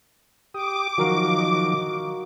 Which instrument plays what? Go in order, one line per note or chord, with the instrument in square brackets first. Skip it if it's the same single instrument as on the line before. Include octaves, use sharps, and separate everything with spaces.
[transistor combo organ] G4 D#6 [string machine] D6
[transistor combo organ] D#3 F3 F#3 [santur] F#4 A#4 F5
[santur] D#5